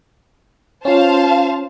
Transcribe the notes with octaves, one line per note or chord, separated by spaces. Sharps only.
C#4 F4 C5 F5 A5